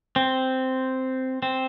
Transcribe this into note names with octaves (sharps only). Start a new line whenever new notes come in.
C4
C4